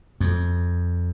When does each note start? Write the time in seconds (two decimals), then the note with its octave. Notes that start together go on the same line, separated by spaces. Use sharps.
0.21 F2